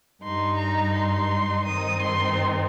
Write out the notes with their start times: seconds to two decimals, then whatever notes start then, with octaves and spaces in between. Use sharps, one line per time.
0.23 G2 G3 D#4 C6
0.59 A#5
0.95 C6
1.66 G2 D#3 C4 D#4 D#6
2.03 C6